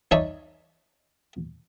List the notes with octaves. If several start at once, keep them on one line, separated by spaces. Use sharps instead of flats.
D#4 C#5 D5 E5 A5